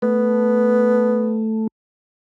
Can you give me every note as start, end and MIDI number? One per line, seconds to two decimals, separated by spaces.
0.02 1.67 57
0.02 1.43 59